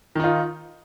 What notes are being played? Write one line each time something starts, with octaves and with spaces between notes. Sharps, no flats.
D#3 D#4 F4